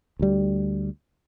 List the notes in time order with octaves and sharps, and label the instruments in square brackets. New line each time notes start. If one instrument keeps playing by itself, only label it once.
[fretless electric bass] D2 G3